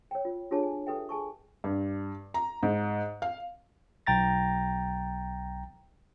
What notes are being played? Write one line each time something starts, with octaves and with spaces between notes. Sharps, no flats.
C#5 G5
F4
D4 F4 G4 G#4 C#5 A5
G#5
G4 A4 B4 E5 G5
G#4 G#5 A5 C#6
G2
A#5
G#2
F5
B1 G5 A#5 A6 A#6